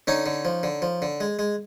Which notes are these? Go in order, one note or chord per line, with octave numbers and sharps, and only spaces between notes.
D3 C#4 D#4
D3
F3
D3
F3
D3
G#3
G#3